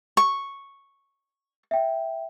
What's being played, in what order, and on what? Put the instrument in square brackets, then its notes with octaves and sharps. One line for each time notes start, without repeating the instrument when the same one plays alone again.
[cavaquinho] C#6
[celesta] E5 G5